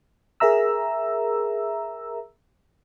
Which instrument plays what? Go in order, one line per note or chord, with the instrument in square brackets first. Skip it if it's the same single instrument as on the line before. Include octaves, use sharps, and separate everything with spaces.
[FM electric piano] G#4 A#4 E5 A#5 E6